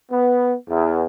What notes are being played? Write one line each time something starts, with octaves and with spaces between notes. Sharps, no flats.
B3
E2